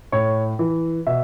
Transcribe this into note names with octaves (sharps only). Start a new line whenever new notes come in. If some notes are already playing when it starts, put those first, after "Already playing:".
A2 C#5
E3
B2 E5